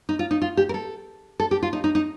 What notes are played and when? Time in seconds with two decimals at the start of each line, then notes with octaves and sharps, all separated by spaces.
0.09 D#4
0.19 F4
0.31 D#4
0.42 F4
0.57 G4
0.69 A#4
0.74 A4
1.40 A4
1.51 G4
1.63 F4
1.73 D#4
1.84 D#4
1.95 D#4